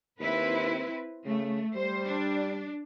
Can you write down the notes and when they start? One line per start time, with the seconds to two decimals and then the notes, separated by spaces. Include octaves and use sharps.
0.20 D#2 C4 E4 B4
1.26 C#3 A3
1.76 G3 C5
2.06 D4